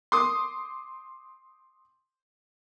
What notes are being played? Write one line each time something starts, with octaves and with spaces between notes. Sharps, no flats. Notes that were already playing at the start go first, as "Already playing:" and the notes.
C6 D6 D#6